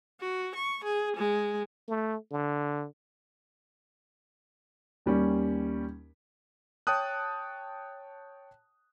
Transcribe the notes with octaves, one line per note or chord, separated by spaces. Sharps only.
F#4
C#6
G#4
G#3
A3
D3
D#2 G3 C#4
C#5 G5 A5 D#6 F#6